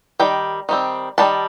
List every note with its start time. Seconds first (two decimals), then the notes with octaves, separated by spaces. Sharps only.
0.20 D#3 G3 G5
0.69 D#3 G3 C4
1.18 D#3 G3 A5